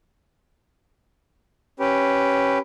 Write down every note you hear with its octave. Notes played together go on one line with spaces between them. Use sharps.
C#4 G4 B4